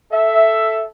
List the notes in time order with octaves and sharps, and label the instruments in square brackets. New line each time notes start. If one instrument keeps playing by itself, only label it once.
[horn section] A4 E5